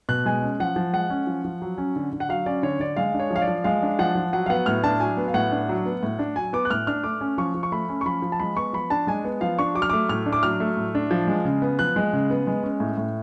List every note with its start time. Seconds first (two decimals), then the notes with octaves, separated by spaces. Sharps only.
0.09 B2 F#6
0.26 G#3 G#5
0.42 C#4
0.60 F3 F#5
0.76 F3
0.93 G#3 F#5
1.10 C#4
1.27 F3
1.45 F3
1.62 F#3
1.78 C#4
1.96 D3
2.13 D3
2.20 F#5
2.29 F#3 F5
2.46 C#4 D5
2.63 D3 C#5
2.80 D3 D5
2.97 G#3 F5
3.14 D4
3.19 C#5
3.30 F3
3.36 F5
3.42 D5
3.47 F3
3.64 G#3 F5
3.83 D4
3.99 F3 F#5
4.15 F3
4.33 F#3 F#5
4.46 F5
4.50 B3 F#5
4.66 A2 F6
4.84 D4 A5
5.00 F#3 G#5
5.17 B3
5.28 F5
5.34 A2 F#5
5.52 D4
5.69 F#3
5.86 B3
6.03 A2
6.19 D4
6.36 F#3 G#5
6.53 B3 D6
6.65 F#6
6.70 A2 F6
6.87 D4 F6
7.04 A3 D6
7.21 C#4
7.38 F3 C#6
7.54 F3
7.63 C#6
7.72 A3 B5
7.89 C#4
8.01 C#6
8.06 F3 B5
8.22 F3
8.32 A5
8.40 G#3 B5
8.57 B3 C#6
8.73 F3 B5
8.90 D4 A5
9.07 G#3 G#5
9.24 B3
9.41 F3 F5
9.59 D4 C#6
9.75 F#3 D6
9.82 F6
9.90 A3 D6
10.09 A2 F6
10.26 D4
10.32 D6
10.43 F#3 F6
10.60 A3
10.77 A2
10.95 D4
11.11 F3
11.27 G#3
11.45 C#3
11.62 B3
11.79 F3 F#6
11.96 G#3
12.13 C#3
12.30 B3
12.47 G#3
12.63 C#4
12.80 A2
12.97 A2